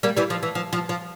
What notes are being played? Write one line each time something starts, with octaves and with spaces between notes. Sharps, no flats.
G3 A#3
E3 G3
F3
E3
F3
F3
F3